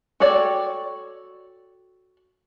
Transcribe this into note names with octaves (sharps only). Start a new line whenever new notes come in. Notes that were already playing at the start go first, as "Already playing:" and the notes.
F#4 A4 C#5 D5 G5